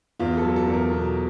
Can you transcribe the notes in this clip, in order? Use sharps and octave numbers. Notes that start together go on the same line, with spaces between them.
E2 F4
A4
F#3
A4
E2
A#4
B2